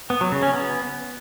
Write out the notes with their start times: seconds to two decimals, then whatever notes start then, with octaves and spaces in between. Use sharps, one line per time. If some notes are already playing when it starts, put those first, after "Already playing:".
0.10 B3
0.21 F#3
0.32 C#3
0.43 C#4
0.53 B3